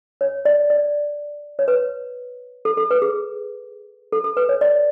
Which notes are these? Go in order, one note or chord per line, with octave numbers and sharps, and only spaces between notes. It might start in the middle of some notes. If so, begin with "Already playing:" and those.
C#5
D5
D5
C#5
B4
A4
A4
B4
G#4
A4
A4
B4
C#5
D5